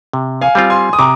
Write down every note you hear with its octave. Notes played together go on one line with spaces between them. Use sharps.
C3
F5 G#5
G3 C4 F4
G#5 C6
D#6
C3 A#5 D6